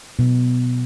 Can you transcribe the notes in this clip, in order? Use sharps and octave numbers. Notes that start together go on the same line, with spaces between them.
B2